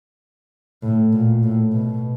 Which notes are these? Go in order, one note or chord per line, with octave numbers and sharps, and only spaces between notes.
A2
A#2
A2
B2